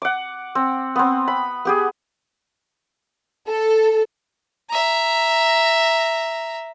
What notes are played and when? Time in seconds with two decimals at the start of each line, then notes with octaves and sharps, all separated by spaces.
0.02 F#5 D6
0.55 C4
0.96 B3 C4
1.28 B5
1.65 B3 G4 G#4
3.48 A4
4.70 E5 A#5